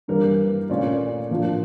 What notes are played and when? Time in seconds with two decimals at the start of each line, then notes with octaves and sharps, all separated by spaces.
0.08 G2 E3 G3 A#3 A#4
0.70 A#2 A3 C#4 F4 D5
1.31 A2 F3 A#3 D4 F4